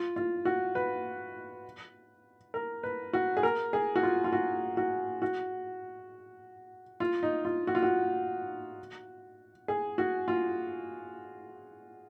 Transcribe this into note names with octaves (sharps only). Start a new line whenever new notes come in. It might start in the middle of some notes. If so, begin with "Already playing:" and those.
Already playing: F4
F4
F#4
B4
A#4
B4
F#4
G#4
A#4
G#4
F#4
F4
F4
F#4
F#4
F#4
F4
D#4
F4
F#4
F4
F#4
G#4
F#4
F4